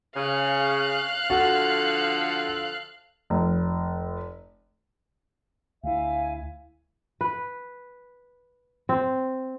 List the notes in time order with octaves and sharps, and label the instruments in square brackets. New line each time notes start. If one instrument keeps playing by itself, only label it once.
[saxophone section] C#3 [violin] F5 F#6
[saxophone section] D3 F3 A4 [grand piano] F#4
[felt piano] F1
[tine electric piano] D2 E4 [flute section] E5 F5 G#5
[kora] B4
C4